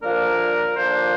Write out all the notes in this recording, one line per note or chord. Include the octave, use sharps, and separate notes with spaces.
D#2 D3 F3 A#3 D4 A#4
D#2 D3 F3 A#3 D4 C5